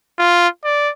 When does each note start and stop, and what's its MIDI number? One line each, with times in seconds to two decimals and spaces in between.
0.19 0.48 65
0.64 0.90 74